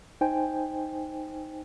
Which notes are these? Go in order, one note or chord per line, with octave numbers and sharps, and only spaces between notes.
D#4 C5 G5 G#5